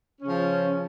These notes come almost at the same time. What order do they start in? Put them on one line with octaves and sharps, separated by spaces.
C#4 C#3 F3